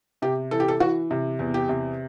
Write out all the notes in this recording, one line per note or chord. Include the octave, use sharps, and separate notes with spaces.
C3 G4
E3 A4
G4
A4
E3 F#4
C3
E2
G4
C3